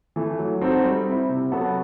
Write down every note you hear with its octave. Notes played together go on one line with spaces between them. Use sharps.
E3 A3
F#3
C4 D#4 F#4 A4
G3
C4 E4
C3
F#3 B3 F#4 A4